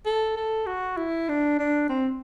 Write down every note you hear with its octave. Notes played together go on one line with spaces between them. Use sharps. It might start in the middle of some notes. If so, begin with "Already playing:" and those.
A4
A4
F#4
E4
D4
D4
C4